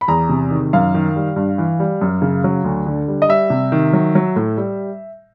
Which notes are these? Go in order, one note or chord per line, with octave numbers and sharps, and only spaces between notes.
B5
E2 A#5
C3
D#3
F#2 F5
D#3
G3
G2
E3
G3
F#2
C#3
F#3
D2
D3
G3
D#5
G3 E5
C3
D#3
F#3
F#3
A2
G3